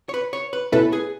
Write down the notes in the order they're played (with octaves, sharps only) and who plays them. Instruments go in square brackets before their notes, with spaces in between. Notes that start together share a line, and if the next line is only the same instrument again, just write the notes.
[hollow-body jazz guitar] C#5
B4
C#5
B4
[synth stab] B2 A3 C#4 E4 B4 [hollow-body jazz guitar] A4
[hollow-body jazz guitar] G#4